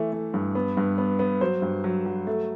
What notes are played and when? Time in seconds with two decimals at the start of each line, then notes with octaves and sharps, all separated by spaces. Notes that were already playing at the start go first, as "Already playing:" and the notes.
Already playing: E3 A3
0.12 A3
0.34 G2
0.55 B3
0.77 G2
0.98 B3
1.19 B3
1.41 F#3 C5
1.62 G2
1.84 F#3
2.06 F#3
2.27 A3